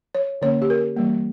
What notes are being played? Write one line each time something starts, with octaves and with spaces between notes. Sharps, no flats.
C#5
D3 A#3 C#4 C#5
G4
A#4
E3 G3 A#3